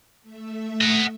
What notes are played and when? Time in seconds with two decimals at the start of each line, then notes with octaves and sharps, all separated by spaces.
0.22 A3 E5
0.81 D#5 F#5